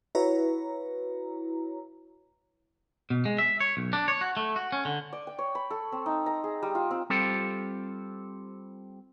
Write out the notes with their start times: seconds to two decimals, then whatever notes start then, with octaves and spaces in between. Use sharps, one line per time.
0.15 E4 F#4 B4 C#5 A#5
3.10 B2
3.25 G#3
3.38 E5
3.60 C#5
3.77 B1
3.93 D4
4.08 C#5
4.21 F#4
4.37 A3
4.56 F#4
4.72 C#4
4.85 D3
5.13 D5
5.27 G5
5.39 C#5
5.55 B5
5.70 A4
5.92 C4
6.06 D#4
6.26 A#5
6.44 G#4
6.62 G3
6.75 F4
6.91 C4
7.10 G3 C4 F4 G4 A4 C5